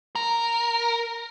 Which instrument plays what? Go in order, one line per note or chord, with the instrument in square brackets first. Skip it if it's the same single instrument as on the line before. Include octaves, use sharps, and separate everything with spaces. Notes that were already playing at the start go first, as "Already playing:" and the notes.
[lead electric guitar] A#4